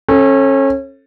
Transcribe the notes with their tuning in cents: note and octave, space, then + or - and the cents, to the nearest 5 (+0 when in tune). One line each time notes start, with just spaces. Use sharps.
C#4 -30 A4 +0